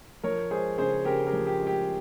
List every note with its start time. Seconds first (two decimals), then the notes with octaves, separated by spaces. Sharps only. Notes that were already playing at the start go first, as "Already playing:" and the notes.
0.23 F3 A#4 C#5
0.51 G#3 G#4 C5
0.78 C#3 G#4 C5
1.05 C#3 G4 A#4
1.26 G4 A#4
1.33 F3
1.47 G4
1.61 G#3
1.67 G4